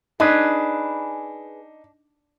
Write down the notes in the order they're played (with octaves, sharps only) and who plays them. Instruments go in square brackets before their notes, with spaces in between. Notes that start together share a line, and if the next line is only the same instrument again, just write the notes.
[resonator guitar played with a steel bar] D4 [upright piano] D#4 [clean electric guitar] G#4 B4